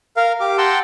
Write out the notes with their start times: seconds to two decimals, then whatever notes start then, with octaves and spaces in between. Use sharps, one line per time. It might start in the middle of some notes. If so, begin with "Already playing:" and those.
0.17 A#4 F5
0.40 G4 D6
0.58 F#5 G5 A5 A#5 C6 E6